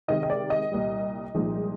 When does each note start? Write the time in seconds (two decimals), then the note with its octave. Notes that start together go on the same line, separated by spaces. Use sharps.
0.08 C3 D#3 G#3 C4 D#4 D#5
0.23 D#5
0.30 D5
0.50 D#5
0.72 C2 A#2 G3
1.35 C2 A#2 F3 G#3 D#4